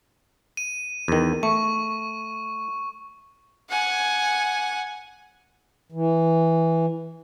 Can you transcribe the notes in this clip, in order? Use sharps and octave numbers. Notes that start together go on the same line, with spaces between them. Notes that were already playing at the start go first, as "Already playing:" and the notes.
D#7
E2 D#3
A3 C#6
F#5 G#5
E3